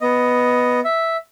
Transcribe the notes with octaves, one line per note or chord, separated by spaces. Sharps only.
B3 D#5
E5